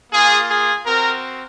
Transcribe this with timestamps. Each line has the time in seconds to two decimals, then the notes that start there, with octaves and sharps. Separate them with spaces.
0.12 A#3 F4 G#4
0.49 G#4
0.86 C4 F#4 A#4